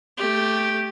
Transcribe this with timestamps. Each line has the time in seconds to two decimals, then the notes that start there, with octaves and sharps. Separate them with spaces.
0.17 A3 G4